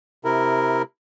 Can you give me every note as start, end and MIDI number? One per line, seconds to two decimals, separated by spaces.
0.25 0.82 48
0.25 0.82 64
0.25 0.82 70